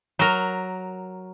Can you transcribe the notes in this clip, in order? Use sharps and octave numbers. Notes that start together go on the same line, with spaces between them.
F#3 A#4